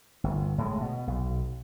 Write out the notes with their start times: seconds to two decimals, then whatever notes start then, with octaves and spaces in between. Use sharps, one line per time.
0.24 G1
0.58 A2 G#3
0.81 B2
1.07 B1